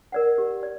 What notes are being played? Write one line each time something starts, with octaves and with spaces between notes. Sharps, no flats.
A#4 D5 F#5
G4
D5